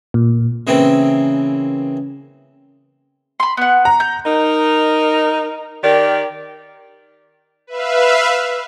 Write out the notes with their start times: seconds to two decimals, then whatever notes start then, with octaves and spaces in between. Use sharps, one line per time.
0.14 A#2
0.67 C#3 E3 A#3 C4
3.40 B5 C6
3.57 B3 F#5
3.85 A#5
4.00 G6
4.26 D#4 A#4
5.83 D#3 G4 A#4 D5
7.67 B4 E5 F5